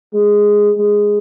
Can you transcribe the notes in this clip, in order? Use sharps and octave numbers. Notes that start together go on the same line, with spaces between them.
G#3
G#3